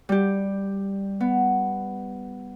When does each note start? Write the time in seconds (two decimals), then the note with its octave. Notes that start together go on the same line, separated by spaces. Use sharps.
0.09 G3 G4
1.20 B3